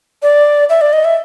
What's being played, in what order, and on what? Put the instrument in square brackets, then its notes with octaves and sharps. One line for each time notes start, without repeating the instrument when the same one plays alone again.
[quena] D5
E5
D5
D#5
E5